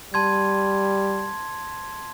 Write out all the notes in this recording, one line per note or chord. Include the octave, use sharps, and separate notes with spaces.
G3 A5 C6 G#6